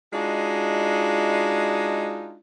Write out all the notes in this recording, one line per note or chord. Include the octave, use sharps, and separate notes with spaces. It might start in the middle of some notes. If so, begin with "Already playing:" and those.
G#3 D4 D#4 F4 F#4